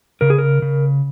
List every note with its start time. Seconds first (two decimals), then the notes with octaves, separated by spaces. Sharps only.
0.21 C#3 A#4
0.30 G#4
0.38 A#4
0.62 C#3